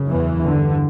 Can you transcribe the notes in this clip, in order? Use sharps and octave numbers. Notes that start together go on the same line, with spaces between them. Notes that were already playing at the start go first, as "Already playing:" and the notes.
Already playing: F#2 C#3
E2 E3
G2 D3